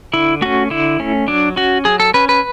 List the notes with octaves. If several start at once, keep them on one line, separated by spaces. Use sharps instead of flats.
D3 E4
A3 C#4 F#4
D3 E4
A3 C#4
F#3 D4
C#4 F#4
F#3 G#4
A4
C#4 B4
B4